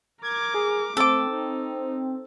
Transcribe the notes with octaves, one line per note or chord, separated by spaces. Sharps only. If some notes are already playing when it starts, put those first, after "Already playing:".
A#4 D6 G#6
G#4
A3 C4 A4 D6
D#4